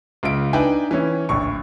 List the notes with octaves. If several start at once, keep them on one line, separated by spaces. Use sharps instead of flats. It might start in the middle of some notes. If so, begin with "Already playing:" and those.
C#2 F4 E5 D7
D4 D#4 B4 E5 G5 G#5
E3 C#4 E4
D1 A#1 C#6